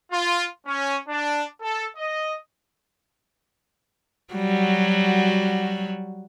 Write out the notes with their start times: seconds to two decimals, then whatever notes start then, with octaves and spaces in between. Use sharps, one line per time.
0.12 F4
0.66 C#4
1.08 D4
1.61 A4
1.97 D#5
4.34 F#3 G3 F#4